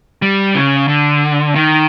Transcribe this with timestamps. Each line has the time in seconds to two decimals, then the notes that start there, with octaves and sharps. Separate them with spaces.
0.22 G3
0.55 C#3
0.88 D3
1.55 D#3